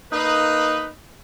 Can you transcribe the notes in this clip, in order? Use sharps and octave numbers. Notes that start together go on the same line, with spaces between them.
A#3 D#4 B4